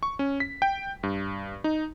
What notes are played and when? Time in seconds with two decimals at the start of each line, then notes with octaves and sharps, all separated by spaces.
0.03 C#6
0.19 C#4
0.40 B6
0.62 G5
1.03 G2
1.64 D#4